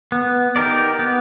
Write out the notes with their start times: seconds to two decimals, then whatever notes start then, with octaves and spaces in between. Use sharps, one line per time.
0.12 B3
0.56 D#4 G4 A#4 D5
0.99 B3